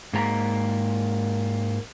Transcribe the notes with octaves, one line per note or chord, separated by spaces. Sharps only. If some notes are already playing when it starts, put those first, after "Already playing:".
G#2 A#3 A#5